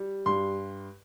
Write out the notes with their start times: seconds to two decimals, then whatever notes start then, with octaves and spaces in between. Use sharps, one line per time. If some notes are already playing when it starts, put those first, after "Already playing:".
Already playing: G3
0.26 G2 C6